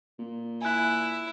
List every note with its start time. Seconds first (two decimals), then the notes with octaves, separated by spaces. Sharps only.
0.19 A#2
0.62 E4 G#5 F#6